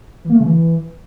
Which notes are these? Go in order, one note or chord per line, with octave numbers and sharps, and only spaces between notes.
E3
A#3
A3
C#3
E3